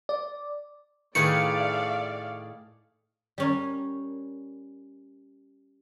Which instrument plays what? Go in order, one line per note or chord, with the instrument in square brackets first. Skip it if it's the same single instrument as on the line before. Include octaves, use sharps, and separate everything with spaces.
[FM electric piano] D5
[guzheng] A2 G#4 [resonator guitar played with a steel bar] D#3 A3 B4 [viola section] D5 F5 [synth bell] C#7
[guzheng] G3 C#4 A#4